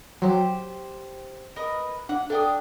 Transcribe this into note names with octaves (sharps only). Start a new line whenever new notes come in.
F#3 G4 C5
A#4 B4 D#5
D4 F#5
D4 A4 G5 D#6